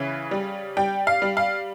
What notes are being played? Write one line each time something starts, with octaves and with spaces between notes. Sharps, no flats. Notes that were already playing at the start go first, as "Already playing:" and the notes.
Already playing: C#3 E3
G3
G3 G5
F5
G3
F5